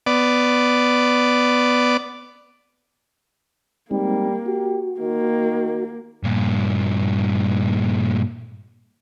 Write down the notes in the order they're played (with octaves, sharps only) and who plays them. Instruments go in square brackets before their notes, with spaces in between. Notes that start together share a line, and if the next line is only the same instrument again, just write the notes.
[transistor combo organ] B3 D5
[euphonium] G3 [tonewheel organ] G#3 C4 D#4 [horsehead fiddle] A#3
[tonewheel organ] F#4 [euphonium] G4
[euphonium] D#3 [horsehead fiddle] A#3
[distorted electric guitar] G2 A#2